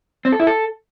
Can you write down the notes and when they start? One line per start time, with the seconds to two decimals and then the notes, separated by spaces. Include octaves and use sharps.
0.25 C4
0.32 A4
0.40 E4
0.47 A4